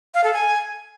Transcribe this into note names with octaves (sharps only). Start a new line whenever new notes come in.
F5
A4
G#5